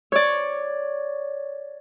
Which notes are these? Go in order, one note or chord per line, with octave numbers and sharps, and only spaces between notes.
C#5 D5